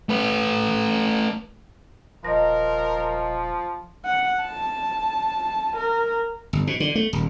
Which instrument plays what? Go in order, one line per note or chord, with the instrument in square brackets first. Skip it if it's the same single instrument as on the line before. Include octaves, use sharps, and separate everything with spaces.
[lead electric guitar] A3 B4
[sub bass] D#1 [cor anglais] F3 [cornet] A#4 [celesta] D#5 A#6
[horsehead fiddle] F#5
A5
A#4
[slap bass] G1
B2
D3
A3
D#1